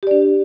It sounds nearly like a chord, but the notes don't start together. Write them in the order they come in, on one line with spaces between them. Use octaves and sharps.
G4 D5 D4